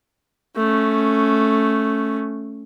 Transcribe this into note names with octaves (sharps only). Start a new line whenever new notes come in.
A3 C#4